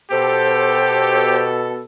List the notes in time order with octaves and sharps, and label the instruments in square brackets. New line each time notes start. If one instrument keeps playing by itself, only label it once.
[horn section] B2 A4 [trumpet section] G4 [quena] C5